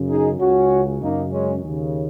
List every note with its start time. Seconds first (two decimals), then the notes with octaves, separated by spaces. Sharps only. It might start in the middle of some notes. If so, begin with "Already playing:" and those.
Already playing: F#2 C#3
0.08 D#4 G#4
0.39 C#2 C#3 C#4 F#4
1.01 F#2 C#3 A#3 D#4
1.31 G#3 C#4
1.63 D#2 C#3